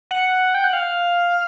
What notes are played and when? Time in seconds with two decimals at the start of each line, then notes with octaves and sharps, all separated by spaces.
0.11 F#5
0.55 G5
0.64 F#5
0.73 F5